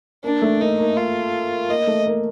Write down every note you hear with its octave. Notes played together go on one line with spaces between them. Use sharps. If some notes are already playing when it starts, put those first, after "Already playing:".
A#3 D4
A3
A#3 D#4
A#3
F4
A#3 D#5
A3
A#3